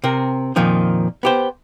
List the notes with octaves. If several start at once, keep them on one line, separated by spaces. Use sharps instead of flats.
C3 C4 A#4
F2 A#2 D#3 F3 D#4
B3 G4 C5